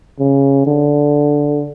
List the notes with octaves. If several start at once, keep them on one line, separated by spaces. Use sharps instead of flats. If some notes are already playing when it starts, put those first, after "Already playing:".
C#3
D3